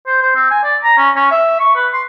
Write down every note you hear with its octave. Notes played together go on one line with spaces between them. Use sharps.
C5
C5
C4
G#5
D5
A#5
C#4
C#4
E5
C#6
B4
C6